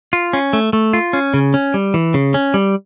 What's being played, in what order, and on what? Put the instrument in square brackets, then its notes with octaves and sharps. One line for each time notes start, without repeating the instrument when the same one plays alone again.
[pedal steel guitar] F4
C#4
A3
A3
F4
C#4
C#3
C#4
G3
E3
C#3
C#4
G3